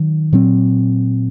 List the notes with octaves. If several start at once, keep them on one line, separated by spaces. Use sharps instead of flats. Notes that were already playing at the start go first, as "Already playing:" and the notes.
Already playing: D#3 F#3
A#2 F#3 C4